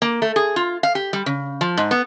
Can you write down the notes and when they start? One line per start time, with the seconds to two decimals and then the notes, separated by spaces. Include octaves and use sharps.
0.02 A#3
0.22 A3
0.36 G#4
0.56 F4
0.83 F5
0.95 G4
1.13 G3
1.26 C#3
1.61 F3
1.77 G#2
1.91 B3